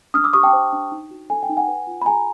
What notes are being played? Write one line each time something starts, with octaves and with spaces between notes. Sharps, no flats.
D4 D#6 F6
D6 E6
G4 C#6 D#6
G5 A5
C5
D4
D#4
F#4
A4 G#5
G5
D#4
F#5 G#5
B4
F4
B5
G#4 G#5 A#5